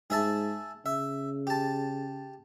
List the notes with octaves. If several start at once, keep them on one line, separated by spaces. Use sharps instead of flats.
G#2 G#4 E5 A5
C#3 E5
G4 A5